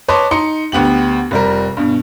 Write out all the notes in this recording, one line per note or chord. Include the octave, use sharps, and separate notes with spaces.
B4 C#5 D#5 A5 C6 D6
D#4 C6 C#7
D2 B3 G4 F#7
F1 G3 A#4
G2 B2